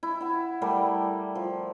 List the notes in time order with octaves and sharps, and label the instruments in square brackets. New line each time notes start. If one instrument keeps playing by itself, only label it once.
[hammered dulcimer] E4
E4 F#5
G3 A3 A#4 D5
F3